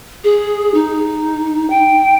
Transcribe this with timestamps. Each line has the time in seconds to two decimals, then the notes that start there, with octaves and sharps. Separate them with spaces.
0.24 G#4
0.74 D#4
1.70 G5